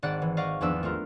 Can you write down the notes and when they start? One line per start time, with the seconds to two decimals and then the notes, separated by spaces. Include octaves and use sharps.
0.03 G#1 D5 F#5 F#6 A6 D7
0.22 E3
0.37 D5 D#5 F5 F#5 C#6
0.61 E2 F3 B3 D4 D5 E6
0.83 A3 B3 F4 A#4